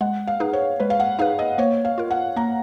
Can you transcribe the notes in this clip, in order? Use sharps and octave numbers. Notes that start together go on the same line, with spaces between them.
G#3 F#5
F5
D#4 G#4 B4
C#5
G#3 B4
F5
F#5
D#4 G#4 B4 F5
D#5
A#3 C#5
F5
F4 A#4
F#5
A#3 A#5